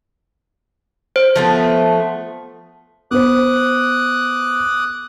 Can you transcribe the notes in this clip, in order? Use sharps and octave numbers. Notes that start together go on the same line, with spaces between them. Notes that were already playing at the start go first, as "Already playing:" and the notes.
C5
F3 A3 B3
B3 C5 D6 D#6 F#6